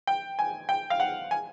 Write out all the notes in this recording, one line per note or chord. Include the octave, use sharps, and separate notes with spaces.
G5
G#5
G5
F5
F#5
G#5